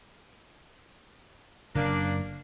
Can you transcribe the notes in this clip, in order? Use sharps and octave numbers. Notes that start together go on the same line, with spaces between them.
F#1 C#3 A#3 D4